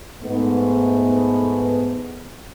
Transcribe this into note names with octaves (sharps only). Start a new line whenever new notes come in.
G#2 A3 B3